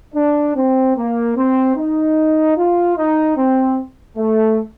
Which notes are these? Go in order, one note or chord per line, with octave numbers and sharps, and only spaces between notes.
D4
C4
A#3
C4
D#4
F4
D#4
C4
A3